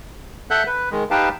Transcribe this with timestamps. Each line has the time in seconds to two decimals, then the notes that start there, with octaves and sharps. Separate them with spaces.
0.51 A4 E5 F#5 F#6 G6
0.67 B4
0.91 D#3 G#3
1.11 D#4 G4 B4 F5 G5 A5